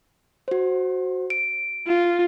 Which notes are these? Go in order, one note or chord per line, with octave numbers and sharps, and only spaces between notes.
F#4 C5
D7
F4